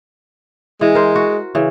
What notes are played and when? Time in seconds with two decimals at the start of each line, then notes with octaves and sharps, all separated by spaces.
0.81 E3 G#3
0.95 A#4 C5
1.16 F#4
1.55 C#3 E3